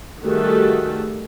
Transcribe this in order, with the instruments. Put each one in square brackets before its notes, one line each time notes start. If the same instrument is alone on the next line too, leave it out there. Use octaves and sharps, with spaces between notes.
[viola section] D#3 G3 A3 F#4 G#4 A4